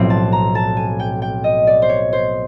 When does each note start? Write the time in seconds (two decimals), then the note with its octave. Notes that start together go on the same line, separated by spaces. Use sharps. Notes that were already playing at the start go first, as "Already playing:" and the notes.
Already playing: B1 A2 F3 A3 C4
0.10 A5
0.32 A#5
0.55 A5
0.77 G#5
1.00 G5
1.22 G5
1.44 D#5
1.67 D5
1.82 C5
1.89 C#5
2.13 C5